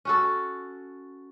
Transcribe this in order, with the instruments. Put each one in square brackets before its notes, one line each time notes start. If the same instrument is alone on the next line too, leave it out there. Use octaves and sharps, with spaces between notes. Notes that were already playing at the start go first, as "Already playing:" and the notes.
[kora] C#4 F#4 A4